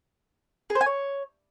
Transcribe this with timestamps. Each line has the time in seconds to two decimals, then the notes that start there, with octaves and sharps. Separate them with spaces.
0.70 G#4
0.75 C5
0.81 G#5
0.86 C#5